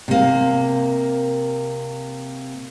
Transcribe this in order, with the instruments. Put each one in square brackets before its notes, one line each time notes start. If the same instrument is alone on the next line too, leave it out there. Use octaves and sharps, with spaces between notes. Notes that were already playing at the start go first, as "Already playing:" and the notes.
[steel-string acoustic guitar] C3 A#3